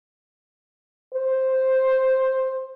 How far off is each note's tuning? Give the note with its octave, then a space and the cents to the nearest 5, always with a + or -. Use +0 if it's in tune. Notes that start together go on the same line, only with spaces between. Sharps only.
C5 +5